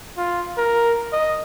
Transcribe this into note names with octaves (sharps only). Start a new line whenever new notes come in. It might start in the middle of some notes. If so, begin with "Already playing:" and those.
F4
A#4
D#5